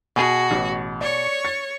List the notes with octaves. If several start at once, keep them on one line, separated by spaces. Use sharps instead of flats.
B2 F#4 G#4 G#5
A1
C#5 D5 C#6
A6